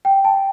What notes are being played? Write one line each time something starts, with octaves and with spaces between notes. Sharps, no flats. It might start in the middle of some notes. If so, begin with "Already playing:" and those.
G5
A5